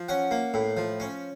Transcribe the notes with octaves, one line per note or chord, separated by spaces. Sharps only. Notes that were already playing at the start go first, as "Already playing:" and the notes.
Already playing: F3
C#4 F#5
A#3
A2
F3
C#4